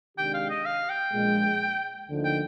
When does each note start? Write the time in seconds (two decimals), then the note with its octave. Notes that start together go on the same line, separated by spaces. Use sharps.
0.17 C3 D#3 G#3 D4 G4 G5
0.34 F5
0.50 D#5
0.65 F5
0.89 G5
1.13 A#1 A#2 G#3
2.08 D2 D3 F3 A#3 D#4
2.24 G5